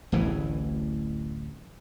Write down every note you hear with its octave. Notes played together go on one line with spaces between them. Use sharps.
D1 A1 A2 E3